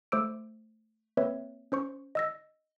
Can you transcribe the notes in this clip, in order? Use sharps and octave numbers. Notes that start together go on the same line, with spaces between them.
A3 C5 D6 E6 D7
A#3 C4 B4 C#5 E5
C#4 C5 C#6
D#5 E6 A#6